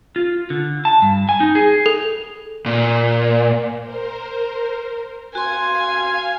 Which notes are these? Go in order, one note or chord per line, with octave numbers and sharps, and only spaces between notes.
F4
D3
A5
G2
G#5
D#4
G#4
A4
A#2
A#4 C5
F#4 F5 G#5 C6